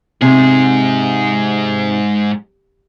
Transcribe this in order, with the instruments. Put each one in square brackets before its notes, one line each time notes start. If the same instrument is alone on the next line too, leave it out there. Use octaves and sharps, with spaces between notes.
[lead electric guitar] G#2 G#4 [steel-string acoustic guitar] C3